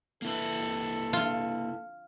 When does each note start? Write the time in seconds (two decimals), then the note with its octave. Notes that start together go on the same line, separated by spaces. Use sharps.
0.22 A#3 E4 A4 B4
1.13 F4